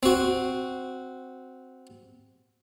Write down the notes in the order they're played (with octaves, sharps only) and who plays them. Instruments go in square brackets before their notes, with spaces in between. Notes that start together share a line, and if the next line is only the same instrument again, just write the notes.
[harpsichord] C4 F#4